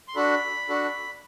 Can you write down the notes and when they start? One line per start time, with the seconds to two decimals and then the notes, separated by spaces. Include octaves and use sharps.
0.08 C6
0.15 D4 F#4 A4 B5
0.68 D4 F#4 A4